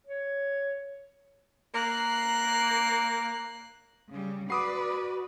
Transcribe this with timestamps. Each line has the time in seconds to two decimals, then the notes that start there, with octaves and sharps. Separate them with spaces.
0.07 C#5
1.75 A#3 A#5 F#6 C7
4.09 C#3 G3
4.50 F#4 B4 D5 B5 D6 D#6 C7
4.89 B5